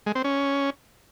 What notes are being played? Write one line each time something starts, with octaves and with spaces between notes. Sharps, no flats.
G#3
C4
C#4